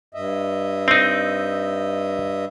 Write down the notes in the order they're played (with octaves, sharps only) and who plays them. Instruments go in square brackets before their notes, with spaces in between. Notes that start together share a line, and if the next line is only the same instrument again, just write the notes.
[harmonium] G2 D#5 E5
[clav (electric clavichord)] C4 D#4